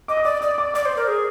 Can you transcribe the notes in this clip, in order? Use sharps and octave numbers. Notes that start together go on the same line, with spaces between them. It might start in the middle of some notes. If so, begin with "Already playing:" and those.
D#5 D6
D#6
D5 D6
D5 D#6
D6
D5 D6
C5
A#4
G#4